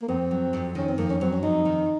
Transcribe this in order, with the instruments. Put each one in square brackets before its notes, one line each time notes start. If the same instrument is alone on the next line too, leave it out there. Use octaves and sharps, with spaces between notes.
[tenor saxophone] A#3
[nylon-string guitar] F2 [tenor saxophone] C4
[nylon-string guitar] F#3
F2
[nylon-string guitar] D#3 [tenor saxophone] C#4
[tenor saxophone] C4
[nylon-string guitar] F2 [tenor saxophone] A#3
[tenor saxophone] C#4
[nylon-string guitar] F#3 [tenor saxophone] C4
[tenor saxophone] C#4
[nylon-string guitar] F2 [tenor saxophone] D#4
[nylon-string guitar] D#3